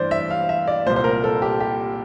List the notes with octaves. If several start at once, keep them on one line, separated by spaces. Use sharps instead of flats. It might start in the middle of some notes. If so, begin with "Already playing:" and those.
Already playing: G2 E3 C5 D5
E5
F5
E5
D5
C2 A#2 C5
C5
A#4
A4
G4
G4